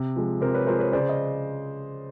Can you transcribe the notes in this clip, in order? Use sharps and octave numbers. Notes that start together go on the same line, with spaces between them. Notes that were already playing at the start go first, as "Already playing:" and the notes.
Already playing: C3
F3 G#3
C3 A#4 C5
B4 C#5
F3 G#3 A#4 C5
B4 C#5
C#3 C5 D5
D#5